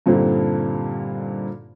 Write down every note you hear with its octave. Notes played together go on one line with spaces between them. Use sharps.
G2 A#2 D3 C4 D#4